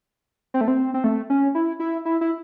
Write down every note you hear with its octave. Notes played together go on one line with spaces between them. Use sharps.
C4
A3
C4
C4
A3
C#4
E4
E4
E4
E4